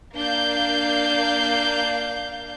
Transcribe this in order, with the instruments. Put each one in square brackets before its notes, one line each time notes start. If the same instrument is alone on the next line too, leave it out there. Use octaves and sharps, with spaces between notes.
[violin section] A#3 D4 F5 G6